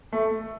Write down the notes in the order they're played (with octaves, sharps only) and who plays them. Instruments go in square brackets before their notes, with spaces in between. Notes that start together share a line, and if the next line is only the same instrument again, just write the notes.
[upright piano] A3